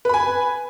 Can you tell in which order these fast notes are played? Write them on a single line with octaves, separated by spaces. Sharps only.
B4 B5 G#5